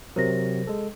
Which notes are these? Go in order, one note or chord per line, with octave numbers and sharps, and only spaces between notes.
C3 F#3 A#4 C5 A#6
G#3 A4